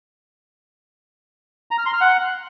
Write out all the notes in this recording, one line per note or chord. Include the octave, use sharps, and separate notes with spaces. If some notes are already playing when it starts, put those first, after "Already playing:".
A#5
F6
C6
F6
F#5